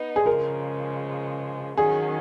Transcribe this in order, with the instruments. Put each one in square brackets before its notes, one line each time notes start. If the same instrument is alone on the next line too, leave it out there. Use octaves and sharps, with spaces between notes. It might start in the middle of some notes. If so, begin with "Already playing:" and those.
Already playing: [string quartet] B3 D#4
[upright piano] G#4
[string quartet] C#3 F3 G#3 [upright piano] A#4
[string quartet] D#3 F#3 C#4 [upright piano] G#4